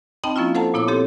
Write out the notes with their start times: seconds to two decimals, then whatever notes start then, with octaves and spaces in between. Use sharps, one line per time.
0.24 C4 D#4 D#5 G5 A5 B5
0.36 F3 A#3 C#4 E4 F4
0.55 A4 C5 F5 F#5 A5 A#5
0.74 A#2 B3 E4 C#5 D6
0.88 C4 G4 A4 C#5